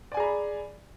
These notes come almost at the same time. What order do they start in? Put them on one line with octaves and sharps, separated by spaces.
D5 G#5 G#4 A#5 B5